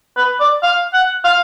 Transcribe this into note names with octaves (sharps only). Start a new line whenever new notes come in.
B4
D5
F5
F#5
F5